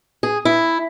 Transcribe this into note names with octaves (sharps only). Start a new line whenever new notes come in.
G#4
E4